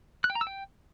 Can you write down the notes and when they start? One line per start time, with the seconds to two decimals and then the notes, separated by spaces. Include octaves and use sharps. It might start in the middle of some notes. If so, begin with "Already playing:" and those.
0.24 F#6
0.30 G5
0.35 A#5
0.41 E6
0.47 G5